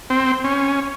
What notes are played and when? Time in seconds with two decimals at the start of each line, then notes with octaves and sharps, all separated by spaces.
0.10 C4
0.44 C#4